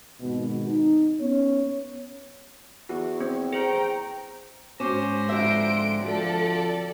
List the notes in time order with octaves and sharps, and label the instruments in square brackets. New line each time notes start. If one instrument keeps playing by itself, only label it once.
[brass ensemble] G#1 B2
D#4
B3 C#4 C#5
[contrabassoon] E2 [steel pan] F#4
[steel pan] C4
[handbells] G#4 C5 [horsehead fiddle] G5 A#5
[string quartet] G#2 C5 A#6 [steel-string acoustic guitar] C#4 [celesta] F#4 D6 E7
[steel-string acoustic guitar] F2 D3 E5 [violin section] C6 D7
[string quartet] F3 [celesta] F#4 [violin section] A4 D5